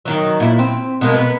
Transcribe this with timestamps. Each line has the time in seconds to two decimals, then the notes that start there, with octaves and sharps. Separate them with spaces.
0.05 D#3 F#3
0.40 A#2 E4
0.59 C4
1.01 B2 G#3 A#3
1.15 B3